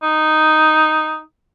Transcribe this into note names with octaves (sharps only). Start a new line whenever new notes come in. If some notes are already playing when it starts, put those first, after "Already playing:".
D#4